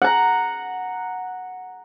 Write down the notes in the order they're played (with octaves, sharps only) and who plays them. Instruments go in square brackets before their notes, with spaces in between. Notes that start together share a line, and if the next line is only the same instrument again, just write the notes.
[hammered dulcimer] F#5 A#5